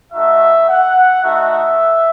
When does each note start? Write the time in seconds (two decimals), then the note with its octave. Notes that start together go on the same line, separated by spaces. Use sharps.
0.13 A3 D#4 F#4 E5
0.68 F#5
1.23 A3 D#4 F#4 E5